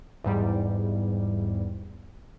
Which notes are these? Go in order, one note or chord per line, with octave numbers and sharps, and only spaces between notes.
E2 G#2 G3